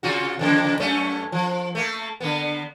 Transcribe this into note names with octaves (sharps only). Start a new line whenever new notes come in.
C3 F4 F#4
F2 C#3 A#3
F#2 A3 C#4
F3
A3 A#3
D3 A#3 B3